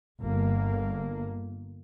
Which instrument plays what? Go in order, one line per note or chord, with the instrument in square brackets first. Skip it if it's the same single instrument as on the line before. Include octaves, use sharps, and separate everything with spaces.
[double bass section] G1 A#3